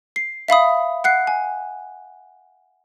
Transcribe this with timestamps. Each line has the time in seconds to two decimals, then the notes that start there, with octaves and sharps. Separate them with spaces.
0.16 C7
0.48 E5 F5 B5 D#6
1.04 F#5 F#6 C7
1.27 G#5